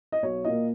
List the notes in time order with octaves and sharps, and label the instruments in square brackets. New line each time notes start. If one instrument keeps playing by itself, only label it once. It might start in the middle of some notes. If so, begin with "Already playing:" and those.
[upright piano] D#5
B1 C#5
A#2 A#3 D#5